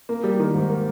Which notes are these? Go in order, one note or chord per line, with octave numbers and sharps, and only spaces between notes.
A#3
G3
D#3
G#2
A#3